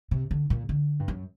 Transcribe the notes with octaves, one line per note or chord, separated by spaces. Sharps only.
C3
D3
A#2
D3
G2
F#2